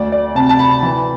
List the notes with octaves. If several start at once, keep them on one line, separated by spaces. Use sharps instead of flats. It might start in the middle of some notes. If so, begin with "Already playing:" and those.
Already playing: D2 D5
D5
C3 A5
A5
B5
E3